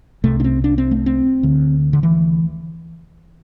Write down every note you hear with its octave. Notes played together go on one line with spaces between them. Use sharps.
C2 C3 A3
D4
C4
D4
C4
A3
C4
D2 D3
D3
E3